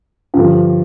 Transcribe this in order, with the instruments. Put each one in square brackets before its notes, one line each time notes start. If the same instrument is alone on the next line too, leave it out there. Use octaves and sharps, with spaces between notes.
[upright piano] G2 D3 F3